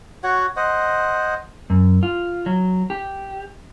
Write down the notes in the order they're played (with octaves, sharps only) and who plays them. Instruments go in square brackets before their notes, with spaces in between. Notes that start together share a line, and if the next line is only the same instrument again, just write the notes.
[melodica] F#4 C#5 F#5 C#6
C5 D#5 F#5
[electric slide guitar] F#2
F4
F#3
G4